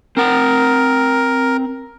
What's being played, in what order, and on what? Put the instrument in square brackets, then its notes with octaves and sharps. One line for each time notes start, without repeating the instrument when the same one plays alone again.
[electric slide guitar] C4 F#5 [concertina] A#4